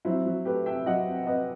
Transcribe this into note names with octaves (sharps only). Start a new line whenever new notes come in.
F#3 C4 E4
F#3
A3 G4 B4
C3 E5 G5
F#3 D#5 F#5
C3
C3 B4 D#5